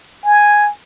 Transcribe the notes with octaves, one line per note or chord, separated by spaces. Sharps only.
G#5